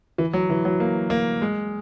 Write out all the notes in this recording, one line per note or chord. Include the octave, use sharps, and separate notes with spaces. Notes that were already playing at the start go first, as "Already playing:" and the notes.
E3
F#3
E3
F#3
A#3
A#3
G#3